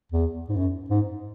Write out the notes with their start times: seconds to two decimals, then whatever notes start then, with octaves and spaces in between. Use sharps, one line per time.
0.12 E2
0.49 G#2
0.56 F#2
0.90 G#2